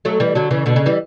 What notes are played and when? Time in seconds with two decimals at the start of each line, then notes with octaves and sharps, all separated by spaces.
0.05 F#3 A3
0.20 E3 G3
0.35 D3 F#3
0.51 C#3 E3
0.66 B2 D3
0.76 C#3
0.86 E3 G3